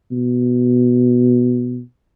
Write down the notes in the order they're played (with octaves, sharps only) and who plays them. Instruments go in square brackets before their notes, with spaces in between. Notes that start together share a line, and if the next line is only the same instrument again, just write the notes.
[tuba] B2